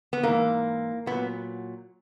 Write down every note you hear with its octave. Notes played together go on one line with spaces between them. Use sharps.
B3
G#2 E3 A#3
A#2 F#3 B3